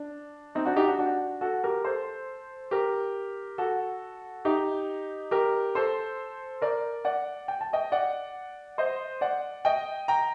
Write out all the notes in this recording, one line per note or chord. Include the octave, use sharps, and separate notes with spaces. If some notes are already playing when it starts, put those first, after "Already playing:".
Already playing: D4
C4 D#4
D4 F#4
D#4 G4
D4 F#4
D4 F#4
F#4 A4
G4 A#4
A4 C5
G4 A#4
F#4 A4
D#4 G4
G4 A#4
A4 C5
A#4 D5
D5 F#5
G5
A5
D#5 G5
D5 F#5
C5 D#5
D5 F#5
D#5 G5
G5 A#5